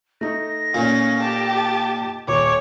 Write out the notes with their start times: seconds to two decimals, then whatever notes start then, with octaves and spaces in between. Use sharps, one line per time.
0.21 A3 D#4 A#6
0.74 A#2 C#4
1.21 G4 A5
2.28 D#1 C#5 D6